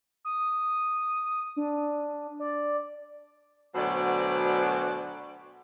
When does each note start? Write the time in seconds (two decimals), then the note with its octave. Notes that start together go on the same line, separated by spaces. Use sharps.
0.25 D#6
1.56 D4
2.40 D5
3.75 D2 B2 F#3 C5 D5